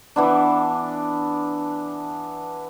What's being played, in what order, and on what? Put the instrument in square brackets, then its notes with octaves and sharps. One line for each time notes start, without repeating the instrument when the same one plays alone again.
[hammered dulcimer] E3 B3 D4